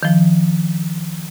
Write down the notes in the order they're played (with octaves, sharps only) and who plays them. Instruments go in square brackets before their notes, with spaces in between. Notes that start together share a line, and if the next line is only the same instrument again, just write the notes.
[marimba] D#3 F3